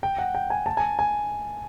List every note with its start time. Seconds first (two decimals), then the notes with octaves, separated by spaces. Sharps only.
0.03 G5
0.18 F#5
0.35 G5
0.50 G#5
0.66 A5
0.77 G#5
0.99 G#5